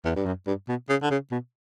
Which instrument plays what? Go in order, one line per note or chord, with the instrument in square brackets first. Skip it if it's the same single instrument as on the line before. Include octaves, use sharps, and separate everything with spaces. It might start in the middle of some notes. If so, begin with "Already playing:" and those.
[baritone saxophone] E2
G2
F#2
G2
B2
C#3
D3
C#3
B2